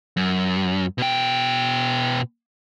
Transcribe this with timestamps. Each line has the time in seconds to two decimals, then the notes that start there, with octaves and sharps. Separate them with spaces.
0.17 F#2
0.98 B2 G5